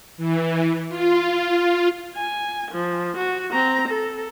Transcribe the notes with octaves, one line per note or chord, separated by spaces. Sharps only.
E3
F4
G#5
F3
F#4
C4 A#5
A4